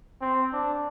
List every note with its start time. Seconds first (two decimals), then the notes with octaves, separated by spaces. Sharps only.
0.21 C4
0.53 D4